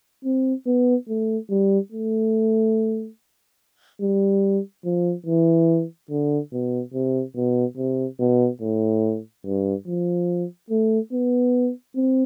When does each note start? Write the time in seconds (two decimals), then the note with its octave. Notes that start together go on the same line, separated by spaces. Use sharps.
0.25 C4
0.66 B3
1.08 A3
1.49 G3
1.92 A3
4.01 G3
4.85 F3
5.26 E3
6.10 D3
6.53 B2
6.93 C3
7.36 B2
7.77 C3
8.20 B2
8.61 A2
9.45 G2
9.87 F3
10.70 A3
11.12 B3
11.95 C4